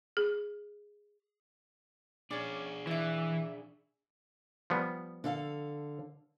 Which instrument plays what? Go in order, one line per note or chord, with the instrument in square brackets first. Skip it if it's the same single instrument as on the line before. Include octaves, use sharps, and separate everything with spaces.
[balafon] G#4
[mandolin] C#4 D5 [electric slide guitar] D4 G#4
[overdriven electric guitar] E3 [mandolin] D5 E5
[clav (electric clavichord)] F3 G3 B3
[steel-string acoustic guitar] D3 A4 F5